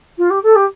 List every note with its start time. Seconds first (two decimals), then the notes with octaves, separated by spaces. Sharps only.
0.18 F4
0.30 G4
0.43 A4
0.56 G4